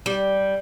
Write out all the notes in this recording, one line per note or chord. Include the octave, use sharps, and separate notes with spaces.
G3